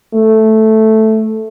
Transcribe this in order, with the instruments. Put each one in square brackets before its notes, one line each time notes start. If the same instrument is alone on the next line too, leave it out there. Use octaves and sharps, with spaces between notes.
[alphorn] A3